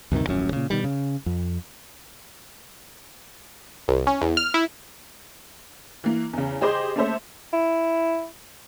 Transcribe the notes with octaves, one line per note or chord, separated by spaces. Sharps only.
D2 G2 C3 D#3
D#1 A1 F#2 C#4
A#2 C#3
B2 D#3 G3
C#3
F2
C2
C#4
E2
F6
E4
E3 A#3
E2 C#3
G4 G#4 C5 D#5 C6 D6
A3 A#3 C#4 A4 C5 E5
E4